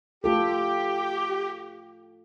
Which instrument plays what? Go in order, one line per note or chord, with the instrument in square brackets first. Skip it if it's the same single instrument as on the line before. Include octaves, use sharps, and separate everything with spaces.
[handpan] A3 F4 A4 [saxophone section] G4